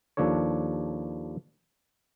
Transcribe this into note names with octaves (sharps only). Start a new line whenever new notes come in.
D#2 F3 D4 A4 C#5